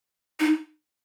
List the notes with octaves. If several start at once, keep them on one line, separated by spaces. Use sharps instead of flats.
D#4